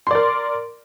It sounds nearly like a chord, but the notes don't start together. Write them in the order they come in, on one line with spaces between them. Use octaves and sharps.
C6 D5 A#4